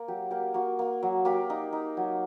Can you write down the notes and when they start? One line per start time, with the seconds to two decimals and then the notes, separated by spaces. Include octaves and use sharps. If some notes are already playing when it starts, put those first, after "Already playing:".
Already playing: A#3 A#4
0.08 F#3 G4
0.31 A#3 G4
0.54 A#3 F#4
0.79 A#3
1.03 F#3
1.25 A#3 G4
1.50 D#4
1.72 D#4
1.97 F#3